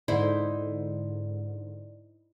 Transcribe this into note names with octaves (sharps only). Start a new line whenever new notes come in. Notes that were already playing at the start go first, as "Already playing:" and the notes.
G#2 D3 D#4 E4 C5 D5